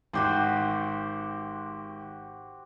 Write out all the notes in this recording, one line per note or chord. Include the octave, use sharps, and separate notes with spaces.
G#1 F#4 G4 C5